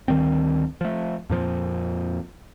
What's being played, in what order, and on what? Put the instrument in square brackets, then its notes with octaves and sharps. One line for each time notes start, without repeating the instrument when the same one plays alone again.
[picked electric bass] D2 D#3 G3 C4
F3 A3
F2 A#2 F3